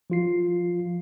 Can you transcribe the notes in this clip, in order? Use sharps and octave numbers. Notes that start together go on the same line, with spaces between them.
F3 F4 C7